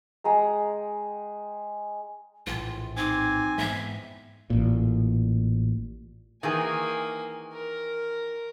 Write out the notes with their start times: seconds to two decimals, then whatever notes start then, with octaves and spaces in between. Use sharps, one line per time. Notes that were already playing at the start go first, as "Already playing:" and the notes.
0.24 G#3 G5 A#5
2.47 A#1 A2 E3 F4
2.96 C4 D#4 G#5 D6
3.58 G#2 E3 B3 E5
4.50 A1 A#2
6.43 D#3 E3 A#3 G#4 G#5
7.53 A#4